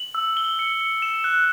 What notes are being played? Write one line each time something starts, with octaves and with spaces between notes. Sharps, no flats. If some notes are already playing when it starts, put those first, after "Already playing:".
Already playing: F#7
E6
G7
C#7
C#7
E7
F#6